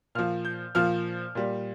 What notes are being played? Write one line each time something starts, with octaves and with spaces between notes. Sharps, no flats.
A#2 F3 F6
G6
A#2 F3 F6
A#2 G3